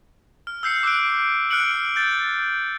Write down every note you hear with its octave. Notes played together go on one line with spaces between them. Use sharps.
F6
E6 G6 C7 C#7
D6 E6 F#6 D7
F6 F#6 C#7 D7 F#7
G6 A6